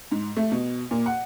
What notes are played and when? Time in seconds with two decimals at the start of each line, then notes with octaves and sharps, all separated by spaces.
0.11 G#2
0.37 A3
0.52 B2
0.91 A#2
1.06 F#5